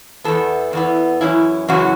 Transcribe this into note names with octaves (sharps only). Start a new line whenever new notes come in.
E2 E3 B3 A4
E2 E3 B3
F#2 C#3 E3 C#4 E4
F#2 C#3 E3 C#4 E4 F#4